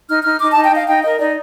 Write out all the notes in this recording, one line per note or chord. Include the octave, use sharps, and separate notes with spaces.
D#4 F6
D#4 F6
D#4 D6
D#4 A5
G5
D#4 F5
D#4 G5
A#4 D#5
D#4 D5